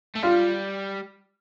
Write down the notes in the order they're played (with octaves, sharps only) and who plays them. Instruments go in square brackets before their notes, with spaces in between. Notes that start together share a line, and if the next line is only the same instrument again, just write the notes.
[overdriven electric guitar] A3
[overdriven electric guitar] G3 [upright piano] F4